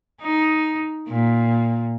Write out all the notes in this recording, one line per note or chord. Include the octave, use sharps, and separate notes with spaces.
D#4
A#2